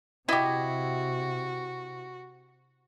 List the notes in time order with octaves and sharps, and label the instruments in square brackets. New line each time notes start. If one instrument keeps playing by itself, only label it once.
[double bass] C3 [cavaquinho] E4 [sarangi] F#4 [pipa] G4 D#5